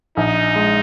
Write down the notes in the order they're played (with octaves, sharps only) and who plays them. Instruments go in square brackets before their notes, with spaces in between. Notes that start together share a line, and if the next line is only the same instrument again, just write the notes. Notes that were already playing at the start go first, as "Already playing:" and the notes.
[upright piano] A#1 [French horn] D#4
[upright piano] G#3